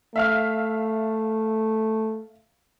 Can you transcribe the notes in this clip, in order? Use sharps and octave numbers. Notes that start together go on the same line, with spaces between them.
A3 E5 F5 F6